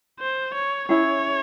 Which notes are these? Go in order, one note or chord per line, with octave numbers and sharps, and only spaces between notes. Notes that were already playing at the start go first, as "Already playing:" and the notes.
C5
C#5
C#4 E4 G#4 C#5